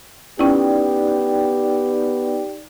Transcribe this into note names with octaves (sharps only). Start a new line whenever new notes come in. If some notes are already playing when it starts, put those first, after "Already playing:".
B3 C#4 D#4 E4 G4 D5 G5